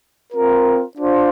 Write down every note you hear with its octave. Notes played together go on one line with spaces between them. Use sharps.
C4 F4 A#4
D4 F4 C5